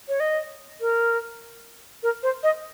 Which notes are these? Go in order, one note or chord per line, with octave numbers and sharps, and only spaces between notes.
C#5
D#5
A#4
A#4
C5
D#5